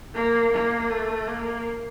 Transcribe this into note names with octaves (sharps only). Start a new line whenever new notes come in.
A#3
A#3
A3
A#3